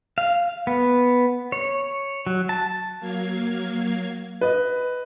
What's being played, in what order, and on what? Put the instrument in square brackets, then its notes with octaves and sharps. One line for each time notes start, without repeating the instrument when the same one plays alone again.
[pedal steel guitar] F5
B3
C#5
F#3
A5
[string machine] F#3 A#3 F5 G#6
[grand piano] B4 D#5